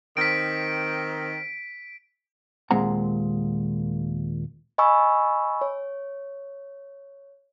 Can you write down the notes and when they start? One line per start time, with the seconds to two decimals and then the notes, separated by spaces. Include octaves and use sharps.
0.17 D#3 C4 B6 D7
2.71 D#2 A#2 G#3 C4 F#5 A#5
4.78 D#5 G#5 B5 C#6 E6
5.61 C#5